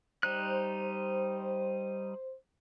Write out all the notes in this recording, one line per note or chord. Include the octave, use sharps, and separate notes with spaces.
G3 D#4 C5 F#6